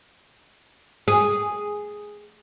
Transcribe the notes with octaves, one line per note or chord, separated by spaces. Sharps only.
G#4